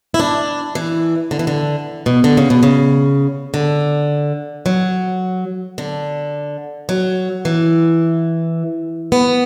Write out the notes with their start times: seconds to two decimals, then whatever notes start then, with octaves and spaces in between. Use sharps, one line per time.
0.14 E4
0.20 D4
0.75 E3
1.31 D3
1.39 E3
1.47 D3
2.06 B2
2.24 D3
2.37 C#3
2.50 B2
2.63 C#3
3.54 D3
4.66 F#3
5.78 D3
6.89 F#3
7.45 E3
9.12 B3